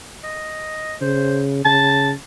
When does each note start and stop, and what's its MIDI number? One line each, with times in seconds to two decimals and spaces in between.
0.24 0.95 75
1.01 1.61 49
1.01 1.43 72
1.65 2.12 49
1.65 2.10 81